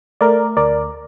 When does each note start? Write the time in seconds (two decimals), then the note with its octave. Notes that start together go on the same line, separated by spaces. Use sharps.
0.21 A3 A#4 D5
0.57 D2 A#4 D5